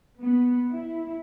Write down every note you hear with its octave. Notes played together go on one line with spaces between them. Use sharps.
B3
E4